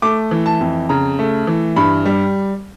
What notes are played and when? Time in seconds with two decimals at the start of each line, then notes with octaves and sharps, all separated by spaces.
0.02 A3 D6
0.31 E3
0.46 A5
0.61 F2
0.89 C#3 A#5
1.19 A3
1.47 E3
1.76 G2 B5
2.05 G3